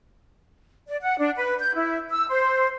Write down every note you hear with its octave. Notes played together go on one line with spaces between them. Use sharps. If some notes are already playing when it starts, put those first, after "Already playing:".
D5
F#5
D4
B4
G6
E4
E6
C5